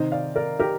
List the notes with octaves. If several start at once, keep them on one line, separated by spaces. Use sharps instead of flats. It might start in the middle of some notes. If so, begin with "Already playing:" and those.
Already playing: C3 D#3 C5 D#5
D5 F5
A#4 D5
G4 A#4